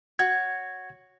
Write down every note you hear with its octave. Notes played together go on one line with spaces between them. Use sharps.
F#4 C#5 G#6